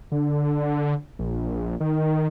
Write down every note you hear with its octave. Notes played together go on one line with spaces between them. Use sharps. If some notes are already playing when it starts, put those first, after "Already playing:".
D3
A#1
D#3